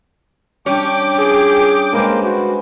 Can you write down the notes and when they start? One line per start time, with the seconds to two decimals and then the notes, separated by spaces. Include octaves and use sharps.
0.66 G3 C#4 D4 G5 D6
1.19 G#4
1.93 G#3 A#3 B4 C5
2.24 F#4